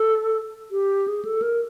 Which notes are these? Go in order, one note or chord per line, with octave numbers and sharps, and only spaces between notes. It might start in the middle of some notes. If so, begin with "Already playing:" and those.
Already playing: A4
G4
G#4
A4
A#4